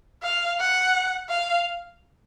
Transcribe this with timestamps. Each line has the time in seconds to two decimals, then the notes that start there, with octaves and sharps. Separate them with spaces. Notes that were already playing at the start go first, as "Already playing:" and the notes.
0.23 F5
0.59 F#5
1.29 F5